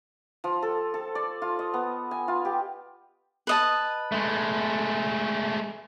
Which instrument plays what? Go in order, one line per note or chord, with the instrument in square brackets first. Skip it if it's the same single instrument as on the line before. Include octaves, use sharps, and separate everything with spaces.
[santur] F3
A4
A4
D5
F4
D#5
B3
G#5
F4
G4
[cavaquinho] B4 D#5 A5
[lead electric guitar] G#3 A3